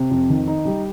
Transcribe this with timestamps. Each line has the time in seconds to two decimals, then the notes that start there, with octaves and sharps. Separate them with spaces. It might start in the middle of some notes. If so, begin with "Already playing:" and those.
Already playing: C3
0.11 F2
0.29 D#3
0.48 D#4
0.65 G3